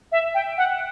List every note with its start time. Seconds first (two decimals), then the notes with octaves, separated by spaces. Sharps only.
0.12 E5
0.34 G5
0.57 F#5